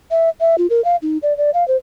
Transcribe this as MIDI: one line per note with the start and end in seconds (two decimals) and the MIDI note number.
0.11 0.29 76
0.40 0.56 76
0.58 0.67 65
0.70 0.84 70
0.85 0.96 77
1.02 1.18 63
1.23 1.36 74
1.37 1.50 74
1.54 1.66 77
1.68 1.76 72